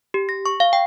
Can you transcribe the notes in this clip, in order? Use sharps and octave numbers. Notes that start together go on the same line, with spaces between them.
G4
A#6
C#6
F5
G5